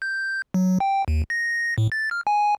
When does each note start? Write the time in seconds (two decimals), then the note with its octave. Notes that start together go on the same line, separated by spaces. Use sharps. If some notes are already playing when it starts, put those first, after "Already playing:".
0.02 G6
0.54 F#3
0.80 G5
1.08 D#2
1.30 A#6
1.78 A2
1.92 A6
2.11 F6
2.27 G#5